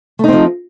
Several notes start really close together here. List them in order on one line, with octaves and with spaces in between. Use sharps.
A3 D#4 C4 F3